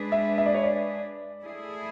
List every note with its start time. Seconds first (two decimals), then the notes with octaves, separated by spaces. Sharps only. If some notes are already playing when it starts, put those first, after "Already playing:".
Already playing: G#3 D4 G#4 B4
0.12 E5
0.38 E5
0.46 D5
0.54 C#5
0.63 D5
1.41 A3 E4 G#4